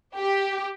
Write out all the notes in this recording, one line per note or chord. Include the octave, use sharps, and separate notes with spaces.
G4